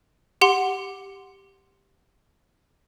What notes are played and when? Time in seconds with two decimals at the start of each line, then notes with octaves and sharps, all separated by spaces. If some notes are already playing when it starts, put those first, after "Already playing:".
0.41 G4 F#5 C6